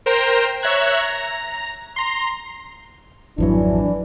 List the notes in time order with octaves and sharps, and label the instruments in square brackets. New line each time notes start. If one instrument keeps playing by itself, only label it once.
[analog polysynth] A#4 C5 G5 A#5
C#5 E5 A#5 F#6 G#6
A#5
A#5 C6
[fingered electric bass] G#1 F2 F#3 [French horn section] E3 D4 E4